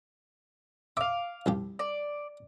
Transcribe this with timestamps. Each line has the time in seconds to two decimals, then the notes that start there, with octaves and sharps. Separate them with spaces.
0.97 E5 F5 D6
1.46 C2 F3 G4
1.79 D5